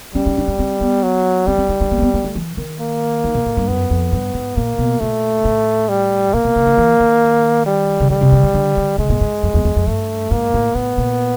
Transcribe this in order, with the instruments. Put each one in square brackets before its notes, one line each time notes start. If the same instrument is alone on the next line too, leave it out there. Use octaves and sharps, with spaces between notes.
[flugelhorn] G3 [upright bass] C#4
[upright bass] D#4
D4
C#4
C4
B3
[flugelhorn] F#3
[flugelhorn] G3 [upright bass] C4
[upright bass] C4
D#4
D4
A#3
C4
B3
A#3
A3
E3
D#3
[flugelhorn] A#3
[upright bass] D#3
A#2
A2
G2
[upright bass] F#2 [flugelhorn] B3
[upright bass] F2
G2
G#2
[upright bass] A#2 [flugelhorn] A#3
[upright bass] B2
[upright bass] A#2 [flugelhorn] A3
[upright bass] A2
[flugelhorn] G3
[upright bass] A#2 [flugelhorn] A#3
[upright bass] B2
C#3
D3
E3
D#3
[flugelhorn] G3
[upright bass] C#3
[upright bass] D3 [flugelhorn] G3
[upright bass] C3
C#3
D3
D3
D3
[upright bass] C#3 [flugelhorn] G#3
[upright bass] A#2
G#2
F2
E2
E2
F2
[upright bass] G2 [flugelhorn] A3
[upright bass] G#2 [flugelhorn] A#3
[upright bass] A2
[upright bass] A2 [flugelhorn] B3
[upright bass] A#2